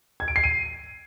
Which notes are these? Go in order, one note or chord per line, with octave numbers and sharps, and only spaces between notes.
G#6
D7
C7
D#7